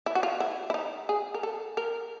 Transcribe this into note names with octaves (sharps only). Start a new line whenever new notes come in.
E4
F#4
F4
E4
E4
D#4
G#4
A#4
A4
A#4